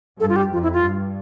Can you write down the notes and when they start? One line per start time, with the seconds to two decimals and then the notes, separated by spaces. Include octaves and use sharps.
0.20 G2 A4
0.29 F4
0.36 G4
0.52 F2 F4
0.63 E4
0.73 F4
0.84 G2